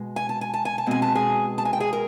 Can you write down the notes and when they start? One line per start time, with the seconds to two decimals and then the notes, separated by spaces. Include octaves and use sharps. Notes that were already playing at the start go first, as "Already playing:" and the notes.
Already playing: B2 G#3
0.16 G#5
0.29 A5
0.41 G#5
0.54 A5
0.65 G#5
0.78 A5
0.86 B2 G#3 C4 G#5
1.02 A5
1.15 G#4 G#5
1.58 A5
1.65 G#5
1.73 G5
1.80 G#4 G#5
1.93 A#4